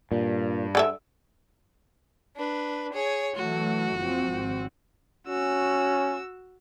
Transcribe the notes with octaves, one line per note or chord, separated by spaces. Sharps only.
G2 A#2
D3 A4 E5
D4 B4
G#4 C#5
E3 F#3 A3 F#4
F#1 F3 C4
G#1 C4
C#4 F#4 E6